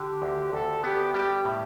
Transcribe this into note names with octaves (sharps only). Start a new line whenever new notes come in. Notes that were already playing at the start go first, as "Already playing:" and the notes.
Already playing: D3 G4
D2
D2 A4
B3 G4
G3 G4
A2